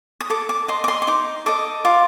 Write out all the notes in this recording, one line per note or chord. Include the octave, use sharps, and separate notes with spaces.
D#6
A4 D6
D6
D#5 C6
D6
C6
C6
D#4 D6
A4 D#5 D6
F4 D6